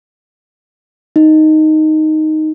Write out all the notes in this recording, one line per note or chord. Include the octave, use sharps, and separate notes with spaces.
D#4